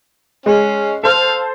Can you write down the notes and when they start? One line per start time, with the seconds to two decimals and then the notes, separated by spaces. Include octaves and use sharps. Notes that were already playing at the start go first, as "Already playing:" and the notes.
0.46 G#3 C#4
1.04 A4 C5 F5